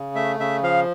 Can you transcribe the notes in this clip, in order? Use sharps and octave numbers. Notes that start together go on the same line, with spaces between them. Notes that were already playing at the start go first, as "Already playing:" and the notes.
Already playing: C#3
A3 E5
C#3 E5
F3 F5